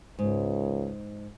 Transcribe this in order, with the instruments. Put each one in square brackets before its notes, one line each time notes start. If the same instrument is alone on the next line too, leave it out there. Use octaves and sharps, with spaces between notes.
[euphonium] C#2 [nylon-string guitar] G#2